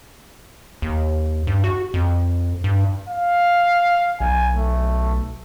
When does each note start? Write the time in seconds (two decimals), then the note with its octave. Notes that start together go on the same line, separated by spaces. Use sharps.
0.82 D#2
1.47 G2
1.64 F#4
1.94 F2
2.64 G2
3.09 F5
4.20 B1 G#5
4.54 A3